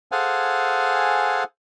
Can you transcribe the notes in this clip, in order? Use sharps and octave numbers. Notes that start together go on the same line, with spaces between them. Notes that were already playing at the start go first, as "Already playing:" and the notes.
G#4 A4 C5 F5 F#5 G#5